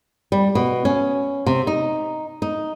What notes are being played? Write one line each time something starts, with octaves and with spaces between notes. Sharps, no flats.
G3
B2
C#4
C3
D#4
D#4